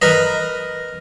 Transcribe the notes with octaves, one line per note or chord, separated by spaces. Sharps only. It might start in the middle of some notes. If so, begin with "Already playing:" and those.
A#4 B4 D#5